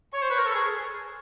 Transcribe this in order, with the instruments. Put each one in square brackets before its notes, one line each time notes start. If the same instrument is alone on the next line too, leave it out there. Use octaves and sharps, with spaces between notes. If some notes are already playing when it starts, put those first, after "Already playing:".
[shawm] C#5 [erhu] C#6
[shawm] C5
B4
A#4
A4
G#4